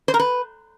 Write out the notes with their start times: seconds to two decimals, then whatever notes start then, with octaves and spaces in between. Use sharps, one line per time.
0.08 C5
0.14 A#4
0.19 B4